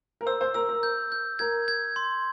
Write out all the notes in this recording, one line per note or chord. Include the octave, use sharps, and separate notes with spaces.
A#4
C5 E6
C5
A#4 E6
A#4
G6
G6
A#4 G#6
G#6
C6